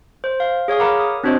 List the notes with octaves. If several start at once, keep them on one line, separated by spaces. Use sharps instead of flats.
C5
F5
G#4 C#5 F5 D#6
A#4 C#5 F#5 A#5 B5 D6
D#6
C4 D4 F#4 C5 C#5 D#5